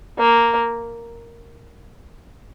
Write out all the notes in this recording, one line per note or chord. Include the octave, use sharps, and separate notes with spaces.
A#3